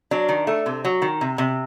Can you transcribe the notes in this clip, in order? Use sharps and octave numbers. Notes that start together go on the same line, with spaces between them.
F#3 D4
D#3
A3
C3
F#3
D#3
C3
C3